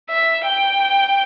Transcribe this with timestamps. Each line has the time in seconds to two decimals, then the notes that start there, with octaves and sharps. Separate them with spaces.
0.10 E5
0.46 G5